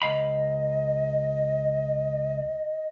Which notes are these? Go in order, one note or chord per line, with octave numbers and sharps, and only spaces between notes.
C#2 D#5 F5 B5